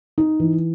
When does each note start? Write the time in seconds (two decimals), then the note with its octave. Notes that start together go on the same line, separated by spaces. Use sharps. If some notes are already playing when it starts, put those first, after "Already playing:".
0.18 D#4
0.40 E3